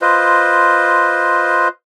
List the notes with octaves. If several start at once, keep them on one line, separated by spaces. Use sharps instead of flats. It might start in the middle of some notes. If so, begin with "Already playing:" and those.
F4 B4 C5 D#5